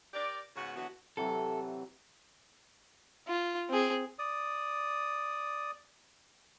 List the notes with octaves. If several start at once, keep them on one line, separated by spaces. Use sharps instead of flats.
G4 A#4 D5
G#2 C#3 B3 F#4
D3 E3 F#3 B3 F#4
C3 E3 F#3 A4
F4
C4 G#4
D5 D#6